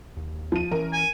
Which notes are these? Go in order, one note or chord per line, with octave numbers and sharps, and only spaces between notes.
D#2
F3 D#7
E3 C#4 A#4
G#5